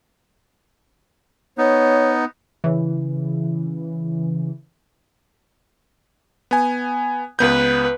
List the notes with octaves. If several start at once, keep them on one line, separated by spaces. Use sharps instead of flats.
B3 D#4 C#5
C#3 E3
B3 G#5
C#2 B3 B4 G6